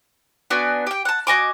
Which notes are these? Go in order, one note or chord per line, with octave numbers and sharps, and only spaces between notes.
B3 D4 F#4 G#5
G4 G5
F#5 A5
F#4 D#5 G#5 D6